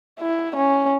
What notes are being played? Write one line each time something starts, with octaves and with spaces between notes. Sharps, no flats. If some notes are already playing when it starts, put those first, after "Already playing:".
E4
C#4